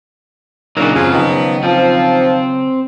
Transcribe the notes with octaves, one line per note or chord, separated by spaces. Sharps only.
A#2 C#3 F#3 D4 D#4 F#4 A#4
F#2 C4 F4 G#4
D#3 F3 B3
D#3 F3 C4